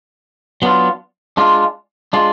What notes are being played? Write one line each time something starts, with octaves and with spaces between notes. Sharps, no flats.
F#3 B3 D4 F4
G#3 D4 F4
G#3 D4 F4